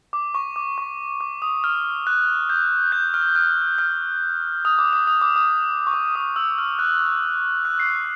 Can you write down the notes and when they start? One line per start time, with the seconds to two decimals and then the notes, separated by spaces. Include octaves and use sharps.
0.13 D6
0.35 C#6
0.56 D6
0.78 C#6
1.21 D6
1.42 D#6
1.64 F6
2.07 F#6
2.49 G6
2.92 G6
3.14 F6
3.36 F6
3.78 F6
4.65 D#6
4.79 D6
4.93 D#6
5.07 D#6
5.22 D6
5.36 D#6
5.87 C#6
5.94 D6
6.15 D#6
6.36 E6
6.58 F6
6.79 F#6
7.65 F#6
7.80 C7